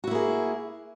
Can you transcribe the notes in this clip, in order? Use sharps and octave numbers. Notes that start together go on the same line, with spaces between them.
A#3 E4 F#4 G#4